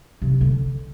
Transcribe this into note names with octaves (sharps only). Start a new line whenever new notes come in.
C3
E4
D3